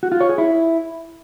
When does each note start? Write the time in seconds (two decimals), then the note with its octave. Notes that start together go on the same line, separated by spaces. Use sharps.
0.03 F#4
0.12 F4
0.20 C#5
0.29 G#4
0.38 E4